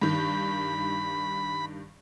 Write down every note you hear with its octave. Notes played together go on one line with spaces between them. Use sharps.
G2 D#3 B5